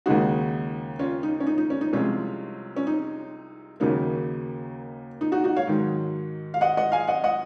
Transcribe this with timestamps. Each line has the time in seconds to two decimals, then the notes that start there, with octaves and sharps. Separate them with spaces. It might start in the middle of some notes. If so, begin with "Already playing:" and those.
0.06 D#2 C#3 G#3 D#4 F#4
0.99 C#4 F4
1.23 D#4
1.40 C#4
1.47 D#4
1.58 D#4
1.70 C#4
1.81 D#4
1.93 C2 C3 F3 G#3 C#4 F4
2.76 C#4
2.87 D#4
3.80 D#2 C#3 F#3 A#3 D#4
5.21 D#4
5.32 D#4 F#4
5.44 D#4 F#4
5.56 C#5 F5
5.67 G#2 D#3 F#3
6.54 F5
6.61 D#5 F#5
6.77 D#5 F#5
6.92 F5 G#5
7.07 D#5 F#5
7.24 D#5 F#5